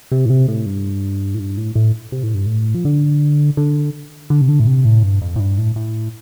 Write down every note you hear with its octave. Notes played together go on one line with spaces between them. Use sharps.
C3
A2
C3
A2
G2
A2
G2
A2
A2
C3
A2
G2
A2
F3
D3
D3
D3
C3
D3
A2
C3
A2
G2
F2
A2
G2
A2
A2